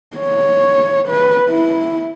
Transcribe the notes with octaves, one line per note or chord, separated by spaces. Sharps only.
C#5
B4
E4